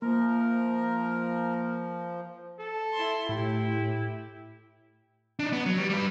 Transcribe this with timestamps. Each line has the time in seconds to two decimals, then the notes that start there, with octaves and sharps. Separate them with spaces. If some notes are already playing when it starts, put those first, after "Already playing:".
0.02 F3 A#3 A#4
2.59 A4
2.93 E4 C6
3.29 A2 E4 G4
5.39 D4 D#4
5.52 B3
5.66 F#3
5.78 G3
5.90 G3 B4